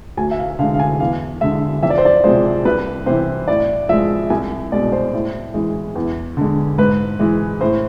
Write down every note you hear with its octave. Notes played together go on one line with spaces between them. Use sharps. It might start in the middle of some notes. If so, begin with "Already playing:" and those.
D2 G#5
E5
F5
D3 G#3 F5
F5
G#5
E2 F5
D3 G#3 E5
F2 E5
D5
C5
D5
C3 F3 G#3 C5
C2 B4
C3 E3 C5
A2 D5
F3 G#3 E5
C2 G#5
B2 G#3 D5
C5
A2
E3 G#3
E2
D3 G#3
G#2 B4
E3 G#3
A2 C5